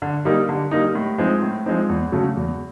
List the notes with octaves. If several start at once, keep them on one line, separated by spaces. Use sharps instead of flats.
D3
G3 A#3 D#4
D3
G3 A#3 D#4
A2
F3 G#3 C4 D#4
A2
F3 G#3 C4 D#4
E2
C#3 F#3 A3
E2